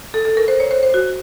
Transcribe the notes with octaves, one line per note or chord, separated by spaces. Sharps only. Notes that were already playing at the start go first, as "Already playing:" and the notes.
A4
A4
A#4
C5
C#5
C5
C5
F#4